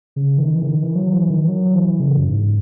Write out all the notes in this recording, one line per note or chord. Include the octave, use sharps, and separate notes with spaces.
C#3
E3
D#3
E3
C#3
D#3
E3
F#3
E3
D#3
F#3
E3
C#3
F#2
G#2